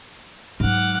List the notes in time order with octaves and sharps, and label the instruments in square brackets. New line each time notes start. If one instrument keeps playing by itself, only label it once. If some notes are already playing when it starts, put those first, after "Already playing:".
[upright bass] G#2 F#3 [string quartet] F#5 D6 F6